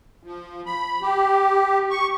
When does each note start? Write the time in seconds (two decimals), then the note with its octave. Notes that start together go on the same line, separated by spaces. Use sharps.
0.23 F3
0.66 B5
1.02 G4
1.90 C#6